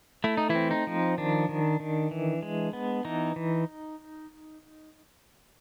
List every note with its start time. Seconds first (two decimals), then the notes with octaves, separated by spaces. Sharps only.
0.24 A3 E4
0.37 D#4
0.49 E3 E4
0.55 C4
0.71 D#4
0.87 F3
1.18 D#3 D4
1.49 D#3
1.80 D#3
2.11 E3
2.43 G#3
2.73 B3
3.05 E3 D#4
3.36 E3